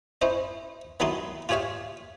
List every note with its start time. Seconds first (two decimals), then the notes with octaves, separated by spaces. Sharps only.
0.21 C#4 E4 C5 D#5
1.00 D#3 F#3 G#3 D#4 E4 C6
1.49 F4 G4 G#4 C#5 E5 F5